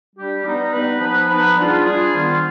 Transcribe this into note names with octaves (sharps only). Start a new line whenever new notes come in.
G3 D4 G4
G3 B3 D#4 B4
G3 B3 D#4 B4
F3 B3 D#4 B4
F3 B3 D#4 B4
G3 D4 F4 G#4
G3 D4 F4 G#4
D#3 G3 B3 F4 C5